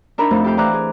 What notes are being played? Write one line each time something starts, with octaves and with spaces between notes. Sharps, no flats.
D4 D#4 A#4 E5 A#5 B5
F2 A3 D#4
G4 A4 E5 F5 G5
E3 C5 D5 A#5 D6 F#6
G#4